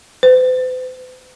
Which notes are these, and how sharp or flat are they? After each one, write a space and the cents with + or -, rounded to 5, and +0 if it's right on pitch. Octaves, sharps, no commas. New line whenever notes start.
C5 -45